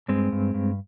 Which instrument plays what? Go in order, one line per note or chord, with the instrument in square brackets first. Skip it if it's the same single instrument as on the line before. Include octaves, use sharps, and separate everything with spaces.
[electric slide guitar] G2 G#3 C4
G2
G2